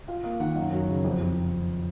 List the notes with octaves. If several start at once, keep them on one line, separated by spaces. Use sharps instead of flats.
F4 F5
A#3 F5
D#3 F#5
F#2 F5
F#3
C#3
F2
F2